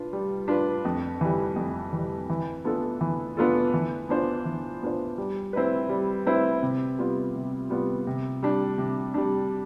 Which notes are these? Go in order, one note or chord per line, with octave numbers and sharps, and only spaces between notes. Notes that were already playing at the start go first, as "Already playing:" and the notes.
Already playing: D4 F4 B4
G3
D4 F4 B4
F2
E3 G3
F2
E3 G3
E3
B3 D4 F4 A4
E3
B3 D4 F4 A4
E3
B3 D4 F4 C5
E3
B3 D4 F4 C5
G3
C4 E4 B4
G3
C4 E4 B4
C3
G3 B3 F4
C3
G3 B3 F4
C3
G3 D4
C3
G3 D4